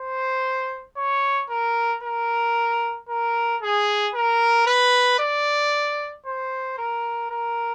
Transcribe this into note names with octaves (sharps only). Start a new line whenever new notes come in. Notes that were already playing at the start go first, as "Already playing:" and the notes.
Already playing: C5
C#5
A#4
A#4
A#4
G#4
A#4
B4
D5
C5
A#4
A#4